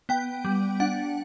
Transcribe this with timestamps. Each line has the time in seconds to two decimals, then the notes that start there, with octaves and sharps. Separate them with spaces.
0.09 B3 G5
0.45 G3
0.80 D4 F#5